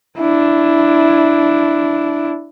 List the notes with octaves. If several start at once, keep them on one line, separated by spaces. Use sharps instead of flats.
D4 E4